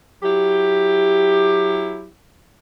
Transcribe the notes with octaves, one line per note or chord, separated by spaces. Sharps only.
F#3 E4 G4